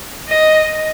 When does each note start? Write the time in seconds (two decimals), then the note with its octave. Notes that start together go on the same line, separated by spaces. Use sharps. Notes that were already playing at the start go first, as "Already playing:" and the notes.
0.28 D#5